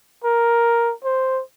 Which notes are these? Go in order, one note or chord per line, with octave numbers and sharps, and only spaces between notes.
A#4
C5